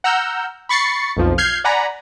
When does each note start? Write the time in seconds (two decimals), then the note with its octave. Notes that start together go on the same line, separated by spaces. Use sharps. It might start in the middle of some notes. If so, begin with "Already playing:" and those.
0.04 F#5 A#5 E6 F6 G6
0.69 B5 C#6 A6 C7 C#7
1.16 B1 F2 F3
1.38 F6 G6 G#6 C7
1.64 D5 F#5 G#5 A#5 B5